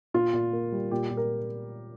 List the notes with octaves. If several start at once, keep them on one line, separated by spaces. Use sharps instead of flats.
A#2 F4
A#2
A#3
G3
A#2 G4
A#2
A#4